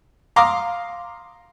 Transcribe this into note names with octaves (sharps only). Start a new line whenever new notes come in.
F5 A#5 C6 D6 D#6